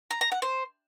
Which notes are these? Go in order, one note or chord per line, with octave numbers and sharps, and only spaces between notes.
A#5
A#5
F#5
C5